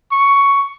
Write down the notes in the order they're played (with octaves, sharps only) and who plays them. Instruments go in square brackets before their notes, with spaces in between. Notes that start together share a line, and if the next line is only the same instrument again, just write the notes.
[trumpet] C#6